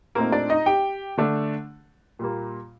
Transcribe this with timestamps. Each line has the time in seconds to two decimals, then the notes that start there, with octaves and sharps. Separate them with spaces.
0.15 A#2 A3 A#3 C4 D#4 A#4
0.32 D4 D5
0.49 D#4 D#5
0.66 G4 G5
1.18 D3 A3 D4
2.19 A#2 G3 A#3